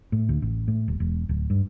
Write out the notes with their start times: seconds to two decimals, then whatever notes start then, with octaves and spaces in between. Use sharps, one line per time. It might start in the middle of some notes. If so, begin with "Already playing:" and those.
0.12 A2
0.29 D2
0.42 A1
0.68 A2
0.88 D#1
1.00 E1
1.29 D1
1.50 G2